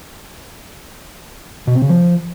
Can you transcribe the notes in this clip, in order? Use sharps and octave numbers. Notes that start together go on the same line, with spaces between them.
B2
C4
C#3
F3